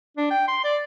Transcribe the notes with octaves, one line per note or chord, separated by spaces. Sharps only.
D4
G5
C6
D5